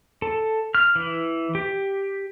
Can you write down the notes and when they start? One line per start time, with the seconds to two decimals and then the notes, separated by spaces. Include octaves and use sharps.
0.22 A4
0.75 F6
0.96 E3
1.55 G4